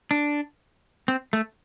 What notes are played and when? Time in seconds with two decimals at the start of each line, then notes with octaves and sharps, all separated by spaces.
0.11 D4
1.08 C4
1.33 A3